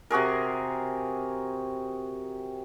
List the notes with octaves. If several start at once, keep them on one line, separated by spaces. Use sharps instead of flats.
C3 F#4 G#4 A#4